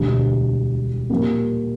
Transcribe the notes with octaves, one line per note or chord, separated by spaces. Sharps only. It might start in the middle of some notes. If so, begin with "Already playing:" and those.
Already playing: E1 D2 D3 G3
A#2 G3 A#3